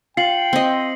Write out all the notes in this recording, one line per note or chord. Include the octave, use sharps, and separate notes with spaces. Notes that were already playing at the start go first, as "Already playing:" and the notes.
F4 G5 C7 C#7 F#7
C4 D#5